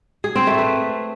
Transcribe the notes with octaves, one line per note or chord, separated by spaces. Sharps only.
G#4
C4
A3
B4